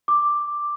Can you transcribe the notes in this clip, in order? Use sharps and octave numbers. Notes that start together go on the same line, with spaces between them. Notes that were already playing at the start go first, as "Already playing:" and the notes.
D6